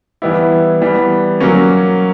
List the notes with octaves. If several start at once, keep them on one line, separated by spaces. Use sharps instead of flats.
E3 G3 B3 E4
E3 G3 B3
F#3 A#3 C#4